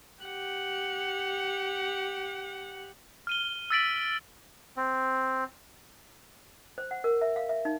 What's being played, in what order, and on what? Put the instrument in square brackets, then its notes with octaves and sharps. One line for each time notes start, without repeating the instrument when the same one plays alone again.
[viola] G4 F#5
[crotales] F6 D#7 G7
E6 F6 A6 B6 D7 F#7
[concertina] C4
[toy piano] C5
F#5
A#4
E5
F5
E5
D#4